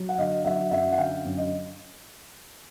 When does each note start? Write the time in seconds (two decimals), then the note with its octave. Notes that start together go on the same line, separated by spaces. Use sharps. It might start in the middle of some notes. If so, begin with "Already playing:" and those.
Already playing: F#3
0.09 F#5
0.18 D3 D#5 F5
0.45 F#3 E5 F#5
0.71 F#2 E5 F#5
0.92 F#5
0.98 D3 F5 G5
1.25 F#2
1.37 D#5